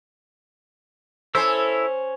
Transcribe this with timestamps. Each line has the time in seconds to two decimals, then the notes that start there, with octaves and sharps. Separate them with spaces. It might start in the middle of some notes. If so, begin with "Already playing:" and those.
1.35 C#4 E4 A4 C5 E6